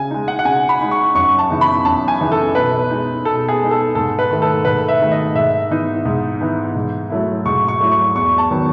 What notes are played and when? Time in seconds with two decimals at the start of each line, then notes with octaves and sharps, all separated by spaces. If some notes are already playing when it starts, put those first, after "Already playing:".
Already playing: C#3 G#5
0.11 G#3 D#4
0.28 F#5
0.39 F#5
0.45 C#3 G#5
0.69 B5
0.81 G#3 D#4
0.91 C#6
1.15 F#2 C#6
1.39 A5
1.50 C#3 E3 B3 D#4
1.61 B5
1.85 F#2 A5
2.08 G#5
2.20 C#3 E3 B3 D#4
2.32 A4
2.55 B2 B4
2.90 G#3 D#4
3.25 B2 A4
3.49 G#4
3.60 G#3 D#4
3.71 A4
3.95 G#2 A4
4.19 B4
4.31 D#3 A3
4.42 A4
4.65 G#2 B4
4.88 E5
5.00 D#3 A3
5.12 D#5
5.35 G#2 E5
5.71 E3 B3 D#4
6.05 G#2
6.41 E3 B3 D#4
6.75 G#2
7.10 F#3 A3 E4
7.45 G#2 C#6
7.68 C#6
7.81 F#3 A3 E4
7.91 C#6
8.15 E2 C#6
8.38 A5
8.50 D#3 F#3 B3